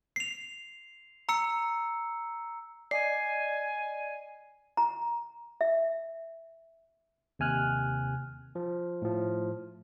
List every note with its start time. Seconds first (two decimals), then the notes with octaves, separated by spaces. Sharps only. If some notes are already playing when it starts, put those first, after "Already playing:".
0.16 C7 F7
1.29 A#5 E6 C#7
2.91 D5 D#5 G#5 C7
4.77 A#5
5.61 E5
7.39 D#2 C3 G#5 F6 F#6
8.55 F3
9.02 A2 F3